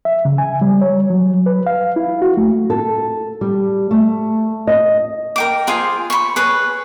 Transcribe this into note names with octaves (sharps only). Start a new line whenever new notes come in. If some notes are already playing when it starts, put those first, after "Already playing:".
E5
C#3
G#5
G3
C#5
F#3
B4
F5
E4
F#4
A3
A4
G3
A3
D#5
A#4 G5 D6
F4 G#4 C5
B5 C#6
G#4 B4 C#5